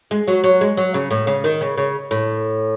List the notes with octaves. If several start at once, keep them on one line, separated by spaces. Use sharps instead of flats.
G#3
F#3
F#3
G#3
F#3
C#3
A2
C#3
D#3
C#3
C#3
A2